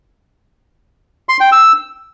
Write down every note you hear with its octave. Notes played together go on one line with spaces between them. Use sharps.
C6
G5
E6